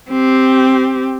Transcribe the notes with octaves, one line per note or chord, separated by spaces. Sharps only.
C4 G4